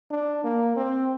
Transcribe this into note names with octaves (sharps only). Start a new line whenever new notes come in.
D4
A#3
C4